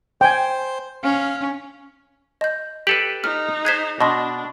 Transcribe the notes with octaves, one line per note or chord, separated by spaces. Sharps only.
C5 G5 G#5
C#4 F5
D#5 G6
G4 A4 B4 F#7
D#4 F6
G#4 C5 F#6 G#6 B6
B2 D4 D#5 A5 C6